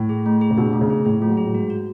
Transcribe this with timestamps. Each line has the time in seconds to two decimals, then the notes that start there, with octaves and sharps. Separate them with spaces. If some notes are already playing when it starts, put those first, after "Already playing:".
Already playing: A2
0.09 G#4
0.26 A3
0.41 G#4
0.50 C#3
0.57 B2 D4
0.70 B2 A3
0.81 C#3
0.90 G#4
1.05 A2 G#4
1.20 F3 A3
1.30 F#3
1.37 G#4
1.45 A2
1.54 G#2 F#4
1.70 F#4